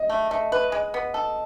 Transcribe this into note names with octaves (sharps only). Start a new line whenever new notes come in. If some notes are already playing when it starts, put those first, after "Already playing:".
Already playing: D#5
A3
A3
B4
G#3
B3
A4